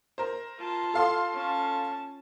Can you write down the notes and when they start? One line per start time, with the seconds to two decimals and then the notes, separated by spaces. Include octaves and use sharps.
0.18 A#4 C5
0.58 F4 A5
0.94 A4 F5 C6
1.32 C#4 A5